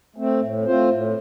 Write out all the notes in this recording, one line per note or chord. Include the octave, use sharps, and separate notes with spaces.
A3 C4
A2
A3 C4 F4 C5
A2